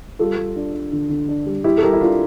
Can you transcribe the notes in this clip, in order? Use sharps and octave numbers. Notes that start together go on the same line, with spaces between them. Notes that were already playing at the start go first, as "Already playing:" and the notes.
G3 F4 A4
G3
D4
D4
D3
D3
D4
G3
G3 E4 G4
A4
G3 G4 A#4
E4
D4 F4